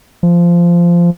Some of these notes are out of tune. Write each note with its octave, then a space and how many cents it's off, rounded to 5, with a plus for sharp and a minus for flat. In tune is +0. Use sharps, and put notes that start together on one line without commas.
F3 -15